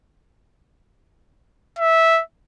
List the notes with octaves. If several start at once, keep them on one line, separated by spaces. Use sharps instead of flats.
E5